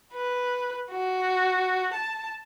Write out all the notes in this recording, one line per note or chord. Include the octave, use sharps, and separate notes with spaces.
B4
F#4
A5